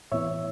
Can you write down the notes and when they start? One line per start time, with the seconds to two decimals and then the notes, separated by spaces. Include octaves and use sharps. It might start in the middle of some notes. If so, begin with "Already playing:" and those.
0.12 A2 E3 B3 E4 C#5 E5